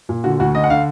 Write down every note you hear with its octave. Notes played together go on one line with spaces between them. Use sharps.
A#2
D3 F#4
D2 F#4
D3 D#5
F#5
D3 F5